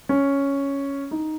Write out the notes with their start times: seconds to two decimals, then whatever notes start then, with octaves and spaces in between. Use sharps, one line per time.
0.09 C#4
1.11 D#4